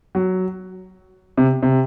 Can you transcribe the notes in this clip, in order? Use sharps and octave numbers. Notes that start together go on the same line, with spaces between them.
F#3
C3
C3